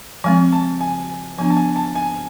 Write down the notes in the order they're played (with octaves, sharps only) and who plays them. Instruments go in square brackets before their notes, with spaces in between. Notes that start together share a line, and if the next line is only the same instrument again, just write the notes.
[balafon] F3 G#3 C4 [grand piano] G#5
[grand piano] A5
G#5
[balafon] F3 B3 D4 [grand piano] G#5
[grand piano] A5
G#5
A5
G#5